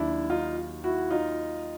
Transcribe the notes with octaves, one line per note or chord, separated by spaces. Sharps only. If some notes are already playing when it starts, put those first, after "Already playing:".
Already playing: D#2 D#3 F#3 D4 E4
D#4 F4
E4 F#4
D#4 F4